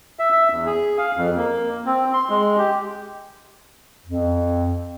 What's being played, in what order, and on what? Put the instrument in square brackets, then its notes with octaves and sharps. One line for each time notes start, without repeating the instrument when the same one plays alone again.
[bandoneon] E5
E5
E2
G#4
F5
F2
A#3
C4
C6
G#3
G4
[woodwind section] F2